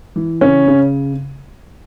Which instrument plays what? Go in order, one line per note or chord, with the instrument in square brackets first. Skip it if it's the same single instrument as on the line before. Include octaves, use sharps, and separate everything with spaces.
[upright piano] E3
[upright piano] C#3 [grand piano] C#4
[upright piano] C#3